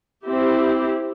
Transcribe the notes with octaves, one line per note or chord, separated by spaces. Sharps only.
C4 E4 G4